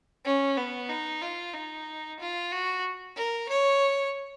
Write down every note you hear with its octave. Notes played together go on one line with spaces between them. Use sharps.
C#4
B3
D#4
F4
D#4
F4
F#4
A#4
C#5